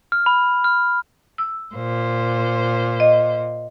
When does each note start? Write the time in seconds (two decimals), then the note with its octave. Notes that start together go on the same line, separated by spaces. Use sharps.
0.12 F6
0.26 B5
0.64 F6
1.38 E6
1.75 A#2 C5
3.00 D#5